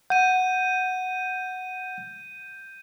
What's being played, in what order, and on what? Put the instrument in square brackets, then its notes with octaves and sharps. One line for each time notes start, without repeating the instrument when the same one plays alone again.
[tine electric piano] F#5 [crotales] G6 D#7